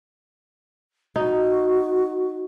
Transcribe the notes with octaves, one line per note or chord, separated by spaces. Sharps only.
D#4 F#4